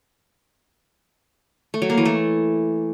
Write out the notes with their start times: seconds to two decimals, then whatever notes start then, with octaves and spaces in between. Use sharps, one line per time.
1.74 A3
1.82 F#3
1.90 A#3
1.98 E3
2.05 A3